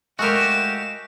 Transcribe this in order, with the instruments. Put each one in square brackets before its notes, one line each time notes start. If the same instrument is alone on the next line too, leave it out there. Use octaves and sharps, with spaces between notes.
[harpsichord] G#3 A3 A#4 [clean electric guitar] F#4 G4 [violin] F5 E7